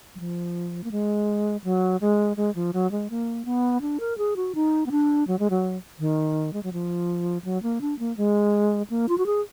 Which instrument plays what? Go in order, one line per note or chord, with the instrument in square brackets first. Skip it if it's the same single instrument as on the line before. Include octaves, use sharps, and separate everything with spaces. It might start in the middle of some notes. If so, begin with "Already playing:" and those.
[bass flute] F#3
F3
A#3
G#3
F#3
G#3
G#3
F3
F#3
G#3
A#3
B3
D4
A#4
G#4
F#4
D#4
B3
D4
F#3
G#3
F#3
D#3
G#3
F#3
F3
F#3
A#3
D4
A#3
G#3
A#3
F4
F#4
G#4